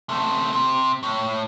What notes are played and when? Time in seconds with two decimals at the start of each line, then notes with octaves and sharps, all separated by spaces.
0.09 C3 A3
0.53 C3
1.03 A2